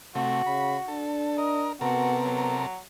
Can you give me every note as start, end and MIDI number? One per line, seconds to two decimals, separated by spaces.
0.15 0.42 48
0.15 0.42 57
0.15 1.06 66
0.46 0.77 49
0.46 0.77 83
0.88 1.76 62
0.88 1.37 69
1.38 1.73 70
1.38 1.67 75
1.81 2.66 48
1.81 2.57 59
1.81 2.16 66
1.81 2.66 69
1.81 2.66 70
2.24 2.76 54